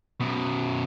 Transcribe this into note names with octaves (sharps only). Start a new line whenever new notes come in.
F#2 B2